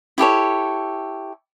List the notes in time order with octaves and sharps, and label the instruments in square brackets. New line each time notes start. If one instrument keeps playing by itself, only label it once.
[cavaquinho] E4 G4 A4 C#5